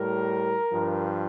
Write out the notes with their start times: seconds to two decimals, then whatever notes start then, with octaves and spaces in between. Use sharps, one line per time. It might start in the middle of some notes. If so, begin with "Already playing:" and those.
Already playing: A2 G3 A#4
0.72 G2 F3